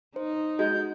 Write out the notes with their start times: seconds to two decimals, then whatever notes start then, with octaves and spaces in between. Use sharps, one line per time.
0.16 D#4 C5
0.59 G#3 F#4 G6